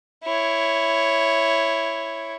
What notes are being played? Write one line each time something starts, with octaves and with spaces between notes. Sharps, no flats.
E4 C#5